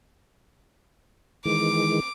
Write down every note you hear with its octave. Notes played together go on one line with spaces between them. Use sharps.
D#3 E3 G#3 D6